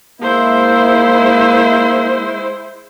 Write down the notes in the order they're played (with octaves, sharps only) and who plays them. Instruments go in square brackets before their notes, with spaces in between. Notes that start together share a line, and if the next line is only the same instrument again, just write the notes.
[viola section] G#3 E4 C5 [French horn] A#3